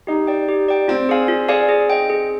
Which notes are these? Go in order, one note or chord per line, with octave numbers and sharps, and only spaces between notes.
D#4 G4
D5 G5
G4
D5 G5
C4 F4
G#4 D5 F5 G#5
F4
G#4 D5 F5 G#5
G#4
D#5 G5
G#4